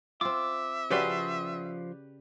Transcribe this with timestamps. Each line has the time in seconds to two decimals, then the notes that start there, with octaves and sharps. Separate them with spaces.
0.21 C4 F4 E5 D6
0.90 C#3 F3 C#4 F#4 G4 B4 D5 C6